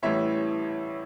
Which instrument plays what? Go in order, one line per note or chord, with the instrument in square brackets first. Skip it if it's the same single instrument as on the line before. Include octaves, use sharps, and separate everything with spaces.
[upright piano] A1 A2 E3 G3 C#5 E5